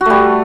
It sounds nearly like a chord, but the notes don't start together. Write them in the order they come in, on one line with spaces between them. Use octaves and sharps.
F#4 A3 G3